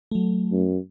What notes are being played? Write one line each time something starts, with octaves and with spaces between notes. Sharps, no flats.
F#3 A3
F#2